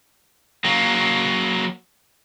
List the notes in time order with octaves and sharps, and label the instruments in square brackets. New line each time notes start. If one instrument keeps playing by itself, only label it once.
[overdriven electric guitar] F#3 A#3